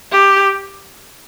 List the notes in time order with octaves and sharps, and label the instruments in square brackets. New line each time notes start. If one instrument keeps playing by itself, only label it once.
[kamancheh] G4